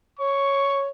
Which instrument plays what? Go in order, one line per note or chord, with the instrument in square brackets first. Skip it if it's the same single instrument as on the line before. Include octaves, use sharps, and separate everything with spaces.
[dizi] C#5 [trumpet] C#6